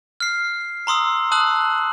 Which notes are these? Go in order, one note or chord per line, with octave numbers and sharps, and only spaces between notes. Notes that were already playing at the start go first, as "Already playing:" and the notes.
F6 C7
A#5 C6 D#6 E6
A5 D#6 E6 F#6 F#7